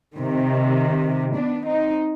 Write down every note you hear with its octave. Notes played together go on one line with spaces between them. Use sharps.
C3 D#3
B3 D4
C4 D#4